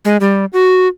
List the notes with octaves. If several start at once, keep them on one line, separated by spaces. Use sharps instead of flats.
G#3
G3
F#4